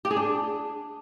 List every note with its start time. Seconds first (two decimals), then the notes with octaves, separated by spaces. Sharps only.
0.05 G4
0.11 G#4
0.17 D4